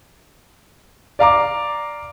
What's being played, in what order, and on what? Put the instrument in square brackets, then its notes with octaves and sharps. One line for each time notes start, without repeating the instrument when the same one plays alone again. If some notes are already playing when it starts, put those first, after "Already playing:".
[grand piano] D5 F5 A#5 D6